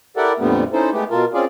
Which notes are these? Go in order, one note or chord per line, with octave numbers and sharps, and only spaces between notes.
E4 G4 A4 A#4 D5 F#5
F2 A#2 D3 G3 A3 B3
C#4 D#4 E4 A4 C5
G#3 A3 B3 G4
B2 F4 A4 A#4
C4 C#4 F4 G#4 D5